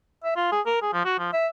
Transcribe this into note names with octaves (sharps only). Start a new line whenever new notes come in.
E5
F4
G#4
A#4
G#4
F3
F#4
F3
E5